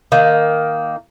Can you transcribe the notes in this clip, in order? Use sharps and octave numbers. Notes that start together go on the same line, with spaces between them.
D#3 A#3